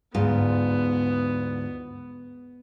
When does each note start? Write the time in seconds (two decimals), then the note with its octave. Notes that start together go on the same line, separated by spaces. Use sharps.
0.15 D2 G#2 B3 F4